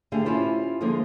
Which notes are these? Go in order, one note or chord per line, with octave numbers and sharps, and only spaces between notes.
D3 A3 G4 G#4 F5
C#4 E4 F4 G4 C5
D3 F3 G#3 A#3